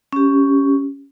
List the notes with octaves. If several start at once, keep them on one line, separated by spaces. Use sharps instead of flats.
C#4 G4